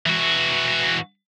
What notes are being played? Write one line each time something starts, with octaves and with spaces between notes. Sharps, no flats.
E3 F#4